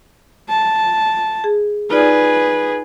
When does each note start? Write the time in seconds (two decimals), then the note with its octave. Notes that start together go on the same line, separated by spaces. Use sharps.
0.49 A5
1.44 G#4
1.90 D#4 F4 G#4 B4 D5